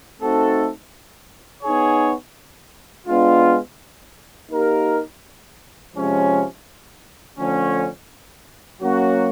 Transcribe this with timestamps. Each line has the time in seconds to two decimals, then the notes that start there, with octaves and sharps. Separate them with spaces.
0.19 A3 C4 D#4 F#4 A4
1.62 B3 D#4 G#4 C#5
3.06 G#3 B3 D4 F4
4.50 A#3 D#4 G4 A#4
5.94 C3 F3 G#3 C#4
7.37 D3 F3 A3 C#4
8.80 F#3 A#3 C#4 F#4